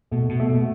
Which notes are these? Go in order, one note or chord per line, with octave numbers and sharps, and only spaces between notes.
B2 A3
B2
A3
B2